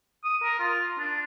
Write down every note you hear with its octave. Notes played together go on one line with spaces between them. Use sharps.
D#6
A#4
F4
D4